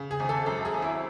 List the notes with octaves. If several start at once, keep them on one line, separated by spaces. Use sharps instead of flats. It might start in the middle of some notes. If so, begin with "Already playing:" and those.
Already playing: C#3
G#4
G#1
A4
F#2 A4
G#4
G#1
E4